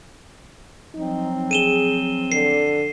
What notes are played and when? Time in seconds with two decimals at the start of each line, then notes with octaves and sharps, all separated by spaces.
0.94 F3 F#3 C4 D#4
1.51 G#4 D#7 E7 G7
2.32 D3 C7